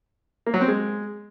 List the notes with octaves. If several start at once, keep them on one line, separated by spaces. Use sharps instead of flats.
A#3
F#3
C4
G#3